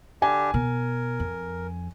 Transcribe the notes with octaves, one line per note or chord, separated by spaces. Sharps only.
D3 D4 G4 G#5
B2 A#4
F2